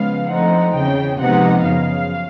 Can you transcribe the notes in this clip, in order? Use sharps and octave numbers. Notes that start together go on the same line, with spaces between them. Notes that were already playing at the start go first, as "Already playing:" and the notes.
Already playing: C#3 F3 G#3 B3 F5
D3 F3 A3 C4 D#4 F#5
E2 C#3 E3 G5
C3 F3 G#3 B3 D#4 F#5
F#2 C#3 F3 F5